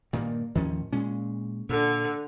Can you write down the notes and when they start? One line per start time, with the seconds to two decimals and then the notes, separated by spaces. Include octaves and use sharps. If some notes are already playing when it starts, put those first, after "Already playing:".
0.13 G2 A#2 D#3 A#3
0.55 D#2 A2 D#3 F3 C#4
0.93 A#2 G#3 C#4
1.69 A#2 D3